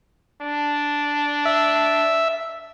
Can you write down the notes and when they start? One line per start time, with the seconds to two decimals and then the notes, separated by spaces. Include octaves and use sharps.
0.42 D4
1.46 E5